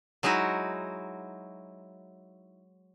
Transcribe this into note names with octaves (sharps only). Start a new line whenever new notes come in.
F#3 G#3 D#4 E4 F#4